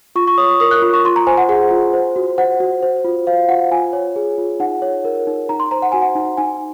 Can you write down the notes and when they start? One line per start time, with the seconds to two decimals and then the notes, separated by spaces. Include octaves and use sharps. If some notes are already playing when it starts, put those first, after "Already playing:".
0.16 F4 C#6
0.27 C#6
0.38 C#5 D#6
0.60 A#4 D#6
0.71 F#6
0.82 F4
0.93 C#6
1.05 F4 C6
1.16 A#5
1.27 C5 G#5
1.38 F#5
1.49 G#4 F#5
1.71 F4
1.93 C5
2.16 F#4
2.38 C5 F#5
2.60 F#4
2.83 C5
3.04 F4
3.27 C5 F5
3.49 F4 F#5
3.71 F4 G#5
3.93 C#5
4.16 G#4
4.38 F4
4.60 D#4 F#5
4.82 C#5
5.05 A#4
5.27 D#4
5.49 D#4 A#5
5.60 C6
5.71 C5 A#5
5.82 F#5
5.92 F#4 G#5
6.02 F#5
6.15 D#4
6.38 D#4 G#5